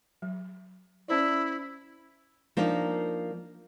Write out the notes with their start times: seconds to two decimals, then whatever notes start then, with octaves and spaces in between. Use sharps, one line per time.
0.22 F#3
1.08 C#4 E4 C5 D5
2.57 F3 A#3 D4 D#4 A#4